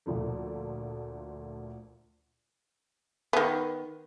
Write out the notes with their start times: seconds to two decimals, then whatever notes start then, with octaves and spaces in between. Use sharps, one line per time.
0.06 D2 A#2 F3 A3
3.33 D#3 B3